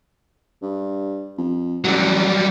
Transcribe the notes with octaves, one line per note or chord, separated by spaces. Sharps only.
G2
F2
A1 F#3 G3